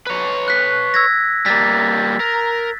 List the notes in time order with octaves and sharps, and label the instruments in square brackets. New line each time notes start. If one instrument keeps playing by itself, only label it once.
[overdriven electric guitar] B4 C#5
[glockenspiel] F#6 B6
E6 G#6 A#6
[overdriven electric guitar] G3 A#3 [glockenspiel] A6 B6
[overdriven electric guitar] A#4